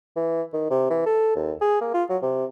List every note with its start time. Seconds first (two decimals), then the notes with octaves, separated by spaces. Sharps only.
0.16 E3
0.53 D#3
0.70 C3
0.90 E3
1.06 A4
1.35 D#2
1.61 G#4
1.81 A#3
1.94 F4
2.10 F#3
2.22 C3